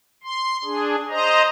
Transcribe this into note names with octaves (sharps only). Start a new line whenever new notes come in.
C6
D4 G#4
C5 D#5 A#5